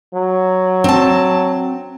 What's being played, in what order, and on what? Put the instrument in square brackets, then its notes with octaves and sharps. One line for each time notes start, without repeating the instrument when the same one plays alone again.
[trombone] F#3
[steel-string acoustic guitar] C4 A5